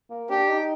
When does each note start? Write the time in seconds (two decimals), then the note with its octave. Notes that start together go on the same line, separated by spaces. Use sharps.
0.10 A#3
0.29 D4 G4
0.48 D#4